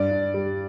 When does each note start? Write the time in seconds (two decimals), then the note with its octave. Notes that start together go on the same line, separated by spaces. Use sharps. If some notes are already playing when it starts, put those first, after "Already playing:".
Already playing: G2 D5
0.11 G2
0.34 G3